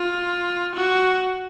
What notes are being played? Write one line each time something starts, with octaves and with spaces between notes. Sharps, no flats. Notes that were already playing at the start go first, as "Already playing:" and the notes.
Already playing: F4
F#4